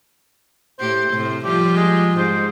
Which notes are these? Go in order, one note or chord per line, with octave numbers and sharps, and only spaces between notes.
A2 G4 C5
A2 C3
F3 G3 F4 G4
G#3
G#2 C5